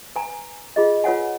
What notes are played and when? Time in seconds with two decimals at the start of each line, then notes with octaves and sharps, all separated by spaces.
0.16 B4 G#5 A#5
0.76 F4 G#4 D#5
1.04 F4 B4 C#5 F#5 G#5